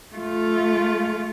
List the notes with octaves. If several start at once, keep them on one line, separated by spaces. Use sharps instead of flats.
A3 F4